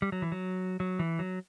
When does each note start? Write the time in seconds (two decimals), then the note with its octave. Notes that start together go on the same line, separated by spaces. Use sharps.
0.02 G3
0.12 F#3
0.22 E3
0.32 F#3
0.80 F#3
0.99 E3
1.19 F#3